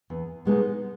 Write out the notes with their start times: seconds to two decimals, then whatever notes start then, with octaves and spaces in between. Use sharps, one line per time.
0.10 E2
0.45 B2 G#3 B3 D#4